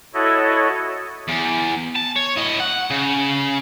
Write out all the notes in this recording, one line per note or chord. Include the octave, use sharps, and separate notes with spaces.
E4 F#4 A4 C#5 D#5
E2
A5
C#5
A2 D#5
F#5
C#3